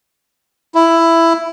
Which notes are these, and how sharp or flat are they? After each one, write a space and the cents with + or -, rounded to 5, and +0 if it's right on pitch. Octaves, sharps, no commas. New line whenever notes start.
E4 +10